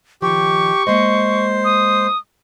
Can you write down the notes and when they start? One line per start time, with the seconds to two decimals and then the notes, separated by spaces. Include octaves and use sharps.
0.22 D#3 F3 G4 C#6
0.87 G#3 A#3 C5 D#5
1.64 D#6